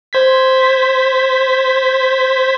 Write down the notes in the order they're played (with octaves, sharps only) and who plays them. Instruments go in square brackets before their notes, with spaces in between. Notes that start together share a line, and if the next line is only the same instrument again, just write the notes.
[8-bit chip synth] C5 G#6 B6